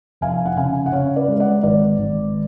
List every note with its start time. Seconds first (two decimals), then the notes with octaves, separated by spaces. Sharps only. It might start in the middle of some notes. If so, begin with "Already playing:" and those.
0.21 F1 F5 G#5
0.46 F#5
0.57 C#3 F5 G#5
0.86 F#5
0.92 C#3 C#5 F5
1.16 B4 D5
1.28 G#3
1.40 D5 F#5
1.63 G#1 B4 D5
1.98 G#1